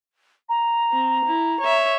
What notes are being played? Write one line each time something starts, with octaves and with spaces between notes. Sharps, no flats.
A#5
C4
E4
C#5 E5